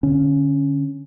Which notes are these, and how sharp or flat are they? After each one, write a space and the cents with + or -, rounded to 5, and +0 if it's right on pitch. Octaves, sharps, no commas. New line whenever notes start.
D3 +0 C#4 +0